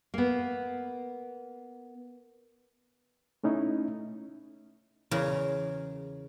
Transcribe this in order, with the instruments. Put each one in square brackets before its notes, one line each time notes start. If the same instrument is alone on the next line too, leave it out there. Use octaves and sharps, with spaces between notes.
[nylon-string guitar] A#3 B3
[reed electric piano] A3 C#4 D#4 E4
[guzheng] E2 C#3 G#4 A#4 A#5